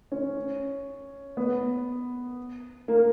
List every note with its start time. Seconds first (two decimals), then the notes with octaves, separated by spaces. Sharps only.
0.12 C#4
1.37 B3
2.88 A#3